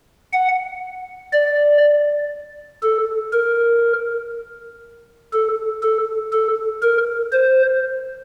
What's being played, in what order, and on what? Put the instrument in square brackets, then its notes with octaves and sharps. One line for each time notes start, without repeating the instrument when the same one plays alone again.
[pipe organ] F#5
D5
A4
A#4
A4
A4
A4
A#4
C5